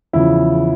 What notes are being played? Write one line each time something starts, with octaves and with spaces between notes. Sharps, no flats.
E2 C#3 F3 E4